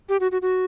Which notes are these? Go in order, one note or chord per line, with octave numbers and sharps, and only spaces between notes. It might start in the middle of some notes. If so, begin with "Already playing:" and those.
G4
F#4
F#4
F#4